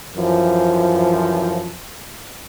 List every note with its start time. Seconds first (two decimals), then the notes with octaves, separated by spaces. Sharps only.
0.17 F#2 E3 F3